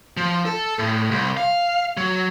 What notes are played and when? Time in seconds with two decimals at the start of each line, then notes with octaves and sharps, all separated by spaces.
0.17 F3
0.45 A4
0.79 A2
1.11 C2
1.37 F5
1.97 F#3